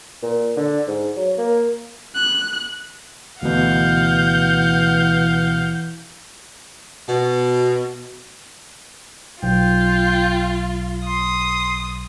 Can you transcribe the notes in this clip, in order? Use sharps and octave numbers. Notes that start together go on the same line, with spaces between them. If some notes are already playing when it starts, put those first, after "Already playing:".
A#2
D3
G#2
F#3
A#3
F#6
D2 B2 E3 F5 F#5 G6
B2
B1 F4 G5
C6 D#6